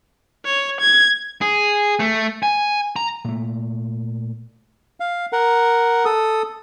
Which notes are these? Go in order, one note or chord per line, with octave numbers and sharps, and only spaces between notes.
C#5
G#6
G#4
A3
G#5
A#5
A#2 A3
F5
A#4 F#5
A4 D#6